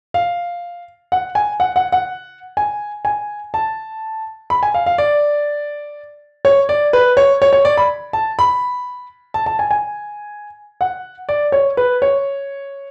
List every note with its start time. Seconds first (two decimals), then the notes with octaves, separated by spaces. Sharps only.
0.14 F5
1.12 F#5
1.35 G#5
1.60 F#5
1.76 F#5
1.92 F#5
2.57 G#5
3.05 G#5
3.54 A5
4.50 B5
4.63 G#5
4.74 F5
4.86 F5
4.98 D5
6.45 C#5
6.69 D5
6.93 B4
7.17 C#5
7.42 C#5
7.53 C#5
7.65 D5
7.77 B5
8.13 A5
8.39 B5
9.34 A5
9.46 A5
9.59 G#5
9.71 G#5
10.81 F#5
11.29 D5
11.52 C#5
11.77 B4
12.02 C#5